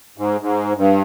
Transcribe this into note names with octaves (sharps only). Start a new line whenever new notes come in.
G#2
G#2
G2